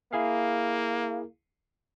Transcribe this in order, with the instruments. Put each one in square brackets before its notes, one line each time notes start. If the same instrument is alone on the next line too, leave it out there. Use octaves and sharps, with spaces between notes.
[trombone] A#3 [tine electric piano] E4 G#4 F5